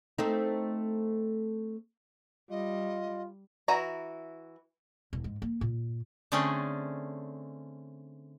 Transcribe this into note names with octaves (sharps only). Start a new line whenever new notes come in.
A3 C4 D#4
G3 F4 D#5
E3 E4 F#4 A#5
E1
G#2
A#3
A#2
D3 A3 C4 C#4 G#4